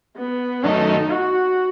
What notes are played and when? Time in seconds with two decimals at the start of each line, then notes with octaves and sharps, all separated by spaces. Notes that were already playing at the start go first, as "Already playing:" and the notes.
0.16 B3
0.63 F#2 D#3 A3 D#4
1.10 F#4